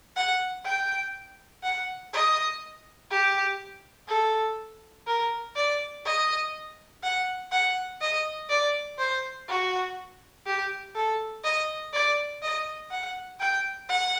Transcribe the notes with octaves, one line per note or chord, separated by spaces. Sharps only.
F#5
G5
F#5
D#5
G4
A4
A#4
D5
D#5
F#5
F#5
D#5
D5
C5
F#4
G4
A4
D#5
D5
D#5
F#5
G5
F#5